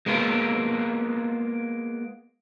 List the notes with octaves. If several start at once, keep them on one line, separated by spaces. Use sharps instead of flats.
G#3 A#3 B3 D#4 F4